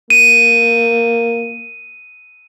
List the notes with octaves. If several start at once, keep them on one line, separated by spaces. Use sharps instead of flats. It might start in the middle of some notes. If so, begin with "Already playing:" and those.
A#3 D#7